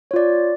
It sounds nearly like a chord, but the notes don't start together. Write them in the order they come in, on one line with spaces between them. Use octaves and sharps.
C#5 F4 D5